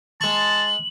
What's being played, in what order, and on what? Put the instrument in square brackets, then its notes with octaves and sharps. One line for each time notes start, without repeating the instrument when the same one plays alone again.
[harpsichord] G#3 C#6 [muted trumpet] A5 [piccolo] F#7